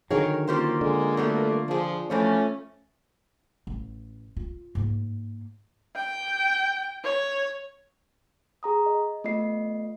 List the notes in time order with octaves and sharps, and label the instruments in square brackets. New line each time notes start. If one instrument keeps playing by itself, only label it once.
[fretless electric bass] D3 D#3 F#3 [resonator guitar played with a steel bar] G#4 A#4 C#5
[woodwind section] A#3 F4 [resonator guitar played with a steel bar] C#4 G4 C5
[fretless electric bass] D3 [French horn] G#3
[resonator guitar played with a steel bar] F#3 G3 B3 [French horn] A3
[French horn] F3 [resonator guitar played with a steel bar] D4 G#4
[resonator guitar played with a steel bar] E3 F3 C#5 [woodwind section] A3 [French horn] C#4
[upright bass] A1
F4
G#2 A#3
[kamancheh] G5
C#5
[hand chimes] G#4 A#5 D#6
D#5
A3 B3 F4 D#5 C7